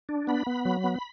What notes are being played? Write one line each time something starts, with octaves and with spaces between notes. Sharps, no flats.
D4
B3 B5
B3
F#3
B3